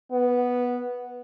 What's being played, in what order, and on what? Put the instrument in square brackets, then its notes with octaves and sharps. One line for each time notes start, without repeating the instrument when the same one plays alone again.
[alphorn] B3